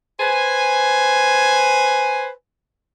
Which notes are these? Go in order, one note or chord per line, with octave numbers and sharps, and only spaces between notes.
B4 C5 G#5